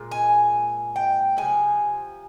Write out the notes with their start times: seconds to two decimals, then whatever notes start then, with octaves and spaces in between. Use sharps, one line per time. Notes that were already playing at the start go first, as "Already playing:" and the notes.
Already playing: A#2 G#3
0.11 G#5
0.96 G5
1.37 C3 F3 G#3 E4 G#5